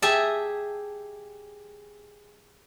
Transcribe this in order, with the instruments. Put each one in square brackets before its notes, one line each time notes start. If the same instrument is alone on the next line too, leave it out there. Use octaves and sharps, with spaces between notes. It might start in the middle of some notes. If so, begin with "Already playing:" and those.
[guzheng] G4 G#4 E5 G#5 A5